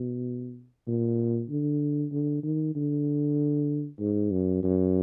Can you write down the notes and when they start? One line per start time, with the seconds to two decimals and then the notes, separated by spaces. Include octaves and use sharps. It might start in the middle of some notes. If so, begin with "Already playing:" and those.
Already playing: B2
0.87 A#2
1.50 D3
2.12 D3
2.43 D#3
2.75 D3
4.00 G#2
4.31 F#2
4.63 F#2